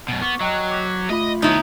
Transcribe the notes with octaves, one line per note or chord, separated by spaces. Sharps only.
F#2 B2
B3 C#6 D6 F6
F#3 D#5 G5 F#6
D6 G6 B6
A3 F4 D#5 B5
D2 B3 D#4 E4 C#5